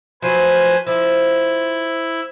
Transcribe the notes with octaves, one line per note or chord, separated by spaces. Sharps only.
F3 F#3 B4 C5 G#5
F3 E4